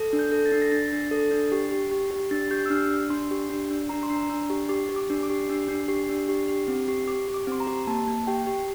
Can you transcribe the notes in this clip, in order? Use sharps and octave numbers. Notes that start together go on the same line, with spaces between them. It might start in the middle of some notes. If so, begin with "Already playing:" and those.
Already playing: A4
D4
G6
A4
A6
D4
A#6
D4 A6
D4
A4
D4
G4
G4
G4
G4
D4 A6
G4 G6
E6
D4 F6
D4
D4 C6
G4
D4
D4
D4 A#5
C6
D4
A#5
D4
G4
G4 D6
G4
D6
D4
D6
G4
D4
D4
G4
D4
G4
G4
C4
G4
G4 D6
G4
D6
C4 C6
A#5
G4
A#3 A5
A#3
G4 G5
G4